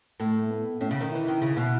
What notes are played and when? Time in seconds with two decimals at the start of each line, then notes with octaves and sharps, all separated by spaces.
0.20 A2 A3
0.42 A3
0.50 B3
0.81 A2 C#4
0.91 C#3
1.01 D#3
1.11 E3 E4
1.28 D#3
1.42 C#3
1.57 B2